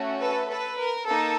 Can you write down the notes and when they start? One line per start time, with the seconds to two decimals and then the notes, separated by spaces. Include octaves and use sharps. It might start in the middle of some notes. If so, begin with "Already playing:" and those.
Already playing: A3 C#4 F#4
0.19 A4 B4
0.48 A4 B4
0.78 A#4
1.06 A#3 D#4 A4